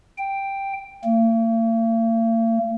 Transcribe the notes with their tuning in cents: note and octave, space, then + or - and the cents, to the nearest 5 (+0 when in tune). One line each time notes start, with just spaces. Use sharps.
G5 +5
A#3 -45